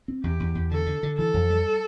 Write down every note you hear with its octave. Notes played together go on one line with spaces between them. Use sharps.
C4
E2 G4
E2
E2
D3 A4
D3
D3
E3 A4
F2
G3